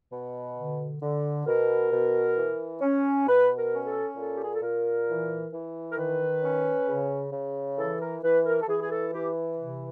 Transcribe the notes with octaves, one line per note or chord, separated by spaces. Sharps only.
B2
D3
D3
B2 A#4
B2
E3
C#4
B2 B4
A#4
C#4
A4
A#2 A4
G4
G#4
A4
A#2 A#4
E3
E3
A#4
D#3 B4
C#4
C#3
C#3
E3 A4
A#4
E3 B4
A#4
A4
E3 G#4
G#4
A4
E3 G4
C3